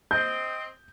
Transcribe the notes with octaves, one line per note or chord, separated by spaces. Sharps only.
C4 D#5 G6